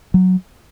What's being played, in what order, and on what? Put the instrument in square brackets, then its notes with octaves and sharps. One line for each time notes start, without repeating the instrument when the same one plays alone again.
[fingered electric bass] F#3